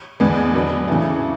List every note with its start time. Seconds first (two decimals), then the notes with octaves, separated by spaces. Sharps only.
0.20 E2 D3 G#3 B3 D4
0.54 F#3 B3 D4
0.88 C#3 E3 A3